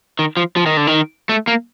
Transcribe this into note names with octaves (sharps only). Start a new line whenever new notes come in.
D#3
F3
F3
D#3
D3
D#3
A3
A#3